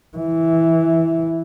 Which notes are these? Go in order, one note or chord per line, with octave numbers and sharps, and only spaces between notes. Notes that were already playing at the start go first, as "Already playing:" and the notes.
E3